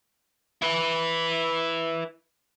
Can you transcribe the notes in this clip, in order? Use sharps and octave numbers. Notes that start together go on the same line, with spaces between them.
E4 B4